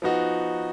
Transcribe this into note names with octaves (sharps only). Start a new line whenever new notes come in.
F3 B3 D#4 F#4